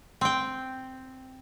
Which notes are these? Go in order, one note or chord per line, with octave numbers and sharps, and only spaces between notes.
C4 G5